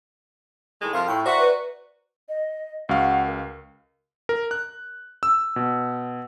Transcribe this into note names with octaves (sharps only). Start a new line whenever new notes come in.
A2 D#3 G#3
F2 C3 A#4 F5 C6 F6
A2 G5 C#6
F#4 C5 D5 E5 A#5
B4
D#5
C#2 F#4 F5 F#5
A#4
A#4
F#6
E6
B2